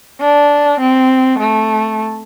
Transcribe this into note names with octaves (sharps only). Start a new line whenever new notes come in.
D4
C4
A3